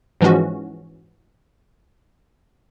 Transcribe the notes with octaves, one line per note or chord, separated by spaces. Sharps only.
G#2 E3 F3 G#3 C#4 F#4